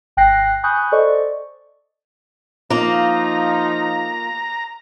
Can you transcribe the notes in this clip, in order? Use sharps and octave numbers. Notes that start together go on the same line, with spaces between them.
G#1 G5 F#6 A#6 C7
G#5 B5 C#6 D#6 F#6 G6
A4 C5 D5 D#5 C#6
F3 A#3 D#4 F4 A#5